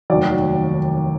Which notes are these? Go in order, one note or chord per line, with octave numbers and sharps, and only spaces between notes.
F1 D#2 D#3 F#3 D5